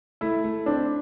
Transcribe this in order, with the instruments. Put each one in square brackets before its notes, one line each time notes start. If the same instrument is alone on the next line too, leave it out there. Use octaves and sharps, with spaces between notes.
[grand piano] A3 [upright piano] E4
[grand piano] A3
[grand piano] C4 [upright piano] D4